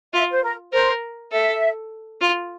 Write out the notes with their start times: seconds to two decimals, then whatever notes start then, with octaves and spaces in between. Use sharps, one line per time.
0.13 F4 E5
0.31 C5
0.43 A#4
0.73 A#4 C5
1.32 A4 E5
2.21 F4